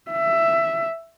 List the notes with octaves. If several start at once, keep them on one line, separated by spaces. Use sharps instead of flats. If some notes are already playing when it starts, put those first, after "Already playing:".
E5